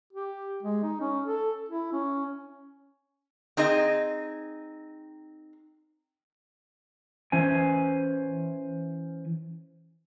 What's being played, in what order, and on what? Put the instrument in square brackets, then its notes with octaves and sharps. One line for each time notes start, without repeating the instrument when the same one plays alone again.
[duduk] G4
G#3
D#4
C#4
A4
E4
C#4
[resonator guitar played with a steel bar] C4 D#4 G#4 D#5
[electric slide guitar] E3 C#4 C5 G#5